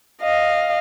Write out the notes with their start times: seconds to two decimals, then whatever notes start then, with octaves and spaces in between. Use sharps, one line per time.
0.22 D#5 F5